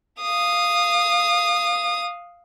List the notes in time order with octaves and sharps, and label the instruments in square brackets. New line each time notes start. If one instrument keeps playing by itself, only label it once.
[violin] F5 D#6